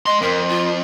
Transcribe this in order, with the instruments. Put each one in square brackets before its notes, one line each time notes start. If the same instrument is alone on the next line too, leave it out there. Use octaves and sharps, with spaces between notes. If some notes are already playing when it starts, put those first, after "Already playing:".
[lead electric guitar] G#3 C6 [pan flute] D#5
[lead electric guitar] F2 [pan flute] A#4
[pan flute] F4